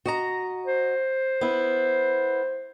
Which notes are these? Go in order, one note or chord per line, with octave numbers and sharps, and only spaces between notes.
F#4 D#5 A#5
C5
B3 E4